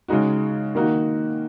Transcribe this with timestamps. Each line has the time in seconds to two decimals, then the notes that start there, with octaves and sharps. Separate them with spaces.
0.08 C#3 G#3 D#4 F#4
0.75 D#3 A#3 D#4 F#4